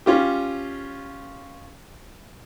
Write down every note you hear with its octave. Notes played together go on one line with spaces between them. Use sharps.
C#4 F4 G4